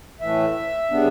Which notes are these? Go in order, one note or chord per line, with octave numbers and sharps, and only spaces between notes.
A2 E3 A3 E5
C#3 G3 B3 D4